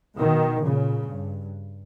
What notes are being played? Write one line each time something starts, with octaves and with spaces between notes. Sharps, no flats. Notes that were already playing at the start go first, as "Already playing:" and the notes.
B2 D#3
A#2 C#3
G2